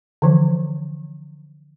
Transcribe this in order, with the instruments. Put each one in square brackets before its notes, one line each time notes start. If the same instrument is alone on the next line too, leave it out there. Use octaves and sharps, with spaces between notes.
[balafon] D3 E3 F3